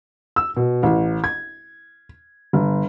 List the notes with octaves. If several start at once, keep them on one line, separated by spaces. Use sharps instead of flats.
E6
B2
A1
G#6
G1